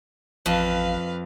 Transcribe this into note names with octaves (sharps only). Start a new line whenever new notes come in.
A1 F2 B4 F5